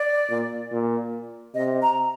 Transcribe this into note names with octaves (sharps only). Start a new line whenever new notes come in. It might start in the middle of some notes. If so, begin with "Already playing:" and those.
Already playing: D5
A#2
A#2
C3 D#5
A#5